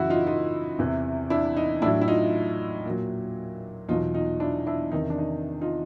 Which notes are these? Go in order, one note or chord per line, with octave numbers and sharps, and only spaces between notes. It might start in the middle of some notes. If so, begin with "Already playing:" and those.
Already playing: F#2 C#3 E3 E4 F#4
D#4 F4
D#4 F4
E2 C3 E3
D4 E4
D#4
A2 F#3 D4 E4
E4
D#4 F4
A#2 F#3
E2 B2 F#3 D#4 F4
D#4 F4
D4 E4
D4 E4
E2 C3 D#3 D#4
D4
D#4
D#4 F4